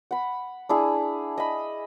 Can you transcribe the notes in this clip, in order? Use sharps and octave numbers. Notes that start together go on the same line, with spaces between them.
F#5 B5
D4 E4 G#4
D#5 B5